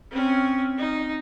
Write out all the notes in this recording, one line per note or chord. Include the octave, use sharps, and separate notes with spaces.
C4 C#4
D#4